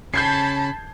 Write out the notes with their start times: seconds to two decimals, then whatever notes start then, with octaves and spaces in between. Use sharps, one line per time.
0.14 C#3 C#4 A5 B5 G6 G#6 C7